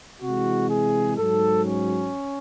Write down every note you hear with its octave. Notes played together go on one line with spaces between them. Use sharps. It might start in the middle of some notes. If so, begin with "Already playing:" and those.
C3 E3 G#3 F#4
G#4
G#2 F#3 A4
C#4